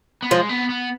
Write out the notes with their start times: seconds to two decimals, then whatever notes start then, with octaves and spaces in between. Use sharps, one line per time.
0.22 B3
0.30 F3 G#3
0.49 B3
0.69 B3